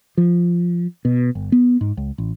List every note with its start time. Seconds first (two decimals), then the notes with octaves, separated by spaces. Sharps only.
0.17 F3
1.05 B2
1.35 G1
1.52 B3
1.81 G#2
1.97 C#2
2.18 A1